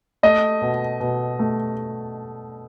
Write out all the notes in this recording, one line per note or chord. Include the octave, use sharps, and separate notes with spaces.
A3 D#5
B2
B2
A3